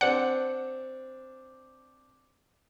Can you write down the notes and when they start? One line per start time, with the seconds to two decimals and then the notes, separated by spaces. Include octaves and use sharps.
0.01 C4 D4 F#5